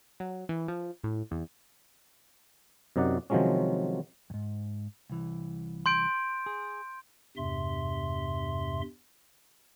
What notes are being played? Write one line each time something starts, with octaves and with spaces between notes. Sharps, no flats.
F#3
E3
F3
A2
E2
F#2 C3 D#4 D5 F#5
C3 D#3 F3 F#3 G#3 C#4
F2 G#2
C2 E3
C6 G6 D7
G#4
E2 G2 C3 E5 C6